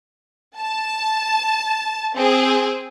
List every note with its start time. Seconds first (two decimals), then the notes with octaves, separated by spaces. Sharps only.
0.58 A5
2.15 C4 G#4